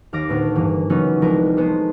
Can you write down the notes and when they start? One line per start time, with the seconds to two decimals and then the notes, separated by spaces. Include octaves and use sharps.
0.13 D#2 F5 D6 A#6
0.29 D2 A2 B3
0.55 G2 E3 A#3
0.90 C#3 E3 F#3 B3 C#4 D#4
1.22 C2 F3 G#3 A#4 B4
1.57 G#3 A3 B3 C5